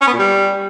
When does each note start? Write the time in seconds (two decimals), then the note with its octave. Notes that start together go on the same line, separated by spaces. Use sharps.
0.01 C#4
0.07 B3
0.13 A#2
0.19 G3